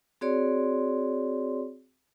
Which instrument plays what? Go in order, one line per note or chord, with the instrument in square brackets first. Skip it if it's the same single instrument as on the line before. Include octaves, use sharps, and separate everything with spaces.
[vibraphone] C4 F#4 G#4 C#5 D5 C6